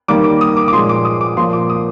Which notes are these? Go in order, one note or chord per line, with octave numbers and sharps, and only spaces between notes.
D#3 G3 A#3 D6
D6
D#6
D6
D6
A#2 F3 G#3 C6
D6
D#6
D6
A#2 F3 A#3 C6
D6
D#6